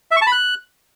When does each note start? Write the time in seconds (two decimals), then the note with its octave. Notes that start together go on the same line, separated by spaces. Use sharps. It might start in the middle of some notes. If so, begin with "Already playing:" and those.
0.11 E5
0.16 C#6
0.22 A5
0.27 B5
0.32 F#6